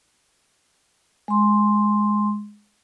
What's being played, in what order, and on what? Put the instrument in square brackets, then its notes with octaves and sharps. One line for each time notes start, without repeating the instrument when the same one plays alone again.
[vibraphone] G#3 C6